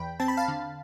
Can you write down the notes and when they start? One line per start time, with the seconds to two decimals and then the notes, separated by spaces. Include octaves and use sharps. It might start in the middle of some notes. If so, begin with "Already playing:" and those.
Already playing: E2 G5 B5
0.20 C4 A5
0.28 B5
0.37 F5 A5
0.48 D3